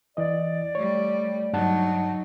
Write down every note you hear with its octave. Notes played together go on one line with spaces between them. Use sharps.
E3 D5 D#5
G3 A3 C#5
G2 F#3 D#4 F#5 A5